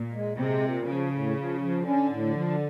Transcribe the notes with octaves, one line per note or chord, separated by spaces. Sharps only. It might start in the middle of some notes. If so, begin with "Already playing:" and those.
Already playing: A#2
G#3
C3 G#3
A#2
C#3 F3
A2
F3
F3
D3 C#4
A2
F3